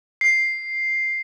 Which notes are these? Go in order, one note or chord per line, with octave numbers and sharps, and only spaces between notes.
C7